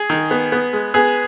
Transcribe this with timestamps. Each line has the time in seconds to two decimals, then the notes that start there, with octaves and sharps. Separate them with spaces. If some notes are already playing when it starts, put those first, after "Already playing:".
Already playing: G#4
0.10 D#3
0.31 B3
0.52 B3
0.73 G#3
0.94 B3 G#4